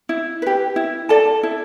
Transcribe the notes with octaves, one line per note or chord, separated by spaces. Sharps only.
E4
G4 B4
E4
A4 D5 A5
E4